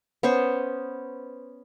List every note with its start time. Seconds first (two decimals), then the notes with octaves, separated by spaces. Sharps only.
0.23 B3 C#4 C5 C#6